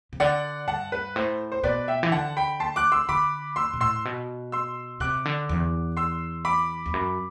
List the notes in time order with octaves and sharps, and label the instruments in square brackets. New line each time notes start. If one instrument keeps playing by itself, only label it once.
[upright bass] C3
[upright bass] D3 [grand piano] D5 F#5
[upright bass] G2 [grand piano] F#5 A5
[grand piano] B4
[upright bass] A2 [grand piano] C5
[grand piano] C5
[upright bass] B2 [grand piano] B4 D5
[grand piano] E5 G5
[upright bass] E3
[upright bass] D3 [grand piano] F#5 A5
[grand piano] G5 B5
A5 C6
D6 F#6
C6 E6
[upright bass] D3 [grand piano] B5 D6
[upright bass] E2 [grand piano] C6 E6
[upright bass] B2
[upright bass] A2 [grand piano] C6 E6
[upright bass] B2
[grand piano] C6 E6
[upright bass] C3 [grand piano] D6 F#6
[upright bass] D3
E2
[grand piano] C6 E6
B5 D6
[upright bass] E2
F#2